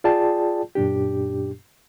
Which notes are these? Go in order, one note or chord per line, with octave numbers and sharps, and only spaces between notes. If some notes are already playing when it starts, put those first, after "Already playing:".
F4 G#4 D5 G5 A5
F#2 A#2 D4 G4